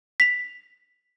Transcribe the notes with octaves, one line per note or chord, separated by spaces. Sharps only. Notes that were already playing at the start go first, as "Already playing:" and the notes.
B6 F7